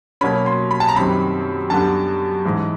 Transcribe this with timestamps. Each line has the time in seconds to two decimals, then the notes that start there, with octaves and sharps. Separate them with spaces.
0.21 B2 F#3 A#3 C#4 B5
0.46 C6
0.71 B5
0.80 A5
0.88 A#5
0.96 F#2 D#3 G3 C4 B5
1.70 F#2 D3 G3 B3 A5
2.45 G#2 E3 G#3